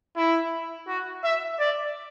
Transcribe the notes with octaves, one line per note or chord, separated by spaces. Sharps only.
E4
F#4
E5
D5